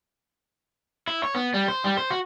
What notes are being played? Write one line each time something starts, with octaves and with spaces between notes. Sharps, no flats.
E4
C#5
B3
G3
C5
G3
C5
F#4